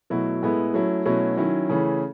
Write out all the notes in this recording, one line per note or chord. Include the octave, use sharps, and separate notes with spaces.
B2 F#3 A3 E4
A2 G#3 B3 E4
F#3 A3 C#4 E4
B2 F#3 A3 C#4 E4
D#3 F#3 C#4 E4
C#3 E3 A3 C#4 E4